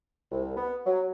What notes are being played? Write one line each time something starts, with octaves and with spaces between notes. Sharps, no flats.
C2
B3
F#3